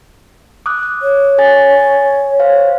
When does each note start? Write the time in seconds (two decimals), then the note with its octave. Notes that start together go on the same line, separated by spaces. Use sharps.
0.66 D6 D#6 F#6
1.02 C#5
1.38 A4 G#5 A6
2.40 C5 F5